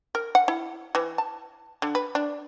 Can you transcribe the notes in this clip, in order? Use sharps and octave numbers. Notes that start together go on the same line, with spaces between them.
A#4
F#5
E4
E3
A5
D3
B4
D4